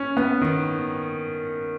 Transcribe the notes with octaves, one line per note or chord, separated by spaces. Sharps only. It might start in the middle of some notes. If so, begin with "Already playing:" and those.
Already playing: C#4
B3
D#3